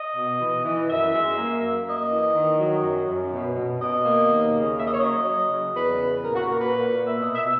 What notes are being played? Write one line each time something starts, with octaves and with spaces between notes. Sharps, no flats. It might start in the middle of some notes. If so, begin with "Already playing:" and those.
Already playing: D#5
B2
E3
E3
F#2 E5
G#3
A#3
F#2
A#3 D#5
E3
D#3
F#3
F#2
F#2
B2
B2
B2 D#5
A#3
D#2
C#3
A#3 E5
D#5
C#5
F#3 D#5
F#3
C#3
E2 B4
C#3
A#2 A#4
F#4
A#3 A#4
B4
A#2
A#3
E5
B2 D#5
E5
B2